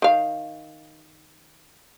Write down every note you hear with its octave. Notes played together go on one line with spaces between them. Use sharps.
D#3 F5